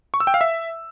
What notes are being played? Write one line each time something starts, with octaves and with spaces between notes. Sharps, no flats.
C#6
E6
G5
F5
E5